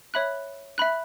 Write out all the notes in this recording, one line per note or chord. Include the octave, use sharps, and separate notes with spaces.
C#5 E5 B5 F#6
E5 B5 F#6